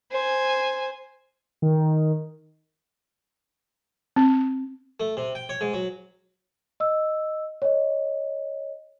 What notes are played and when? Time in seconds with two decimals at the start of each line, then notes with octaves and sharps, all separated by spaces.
0.12 C5 G#5
1.62 D#3
4.16 C4
5.00 A3
5.17 C3
5.35 G5
5.49 C#5
5.61 G#2
5.73 F#3
6.80 D#5 E6
7.62 C#5 D#5